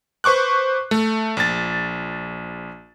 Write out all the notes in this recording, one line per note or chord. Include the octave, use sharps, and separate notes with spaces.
B4 C5 C#6 D6 F#6
A3
A#1 A6